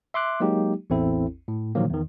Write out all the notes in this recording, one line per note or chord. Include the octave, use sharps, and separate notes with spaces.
E5 C6 D6 F#6
F#3 G#3 A#3 D#4 G4
A1 E2 C4 E4 A4
A2
A#2 D3 D#3 F3 F#3 A#3
E2 D#3